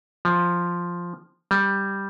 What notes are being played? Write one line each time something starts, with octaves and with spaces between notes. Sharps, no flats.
F3
G3